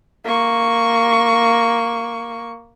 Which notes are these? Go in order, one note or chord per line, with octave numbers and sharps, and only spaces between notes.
A#3 C#6